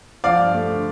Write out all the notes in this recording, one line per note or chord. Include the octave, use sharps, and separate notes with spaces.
F3 D5 F5
G2
A3
D3